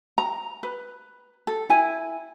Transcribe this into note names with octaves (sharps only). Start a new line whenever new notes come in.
A#5
B4
A4
E4 G#5